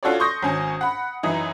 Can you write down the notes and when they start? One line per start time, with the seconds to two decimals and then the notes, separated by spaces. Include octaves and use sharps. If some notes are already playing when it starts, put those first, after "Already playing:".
0.03 C#4 F4 F#4 A4 C#5 D5
0.20 C6 C#6 D#6 G6 A#6
0.43 G#1 C#4 G#5
0.81 F#5 B5
1.23 F#2 E3 D#4 D#6